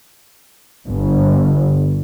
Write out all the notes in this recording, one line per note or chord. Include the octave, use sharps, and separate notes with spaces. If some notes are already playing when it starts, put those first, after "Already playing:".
G1